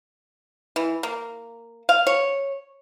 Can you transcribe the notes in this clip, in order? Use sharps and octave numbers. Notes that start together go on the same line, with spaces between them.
E3
A#3
F5
C#5